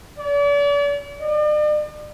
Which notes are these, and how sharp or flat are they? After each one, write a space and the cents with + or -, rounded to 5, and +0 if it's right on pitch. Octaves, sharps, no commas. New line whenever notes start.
D5 -40
D5 +40